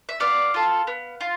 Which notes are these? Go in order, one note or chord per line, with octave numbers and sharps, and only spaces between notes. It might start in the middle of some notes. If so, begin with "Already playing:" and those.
E5
B3 D5 F5
F4 A4
B3
F4